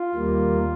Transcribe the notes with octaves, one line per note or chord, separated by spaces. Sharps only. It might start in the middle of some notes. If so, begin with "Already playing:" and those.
Already playing: F4
D#2 D#3 G3 A#3